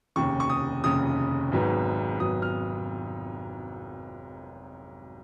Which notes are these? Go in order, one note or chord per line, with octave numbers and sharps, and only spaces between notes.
F1 D#2 C#3 C#6
C#6
D#6
F1 D#2 C#3 D#6
G#1 G#2 F#3 B3
G#1 G#2 F#3 B3 D#6
F6